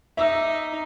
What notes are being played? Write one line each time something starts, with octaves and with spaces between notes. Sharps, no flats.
D#4 E5 D6 E6